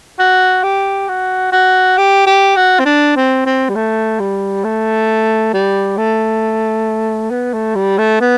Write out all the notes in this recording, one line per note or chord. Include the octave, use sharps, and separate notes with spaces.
F#4
G4
F#4
F#4
G4
G4
F#4
C4
D4
C4
C4
G3
A3
G3
A3
G3
A3
B3
A3
G3
A3
B3